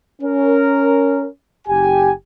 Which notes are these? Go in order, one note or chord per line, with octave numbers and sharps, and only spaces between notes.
C#4 A#4
F#1 G4 G#5